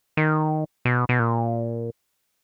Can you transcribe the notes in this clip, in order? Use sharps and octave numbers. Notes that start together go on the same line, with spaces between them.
D#3
B2
B2
A#2